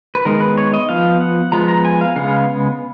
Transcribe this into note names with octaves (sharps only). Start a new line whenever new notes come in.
B4
D#3 G#3 B3 A#4
B4
C#5
D#5
F3 B3 F5
F#5
F3 G#3 B3 A#5
A#5
G#5
F5
C#3 G#3 B3 F5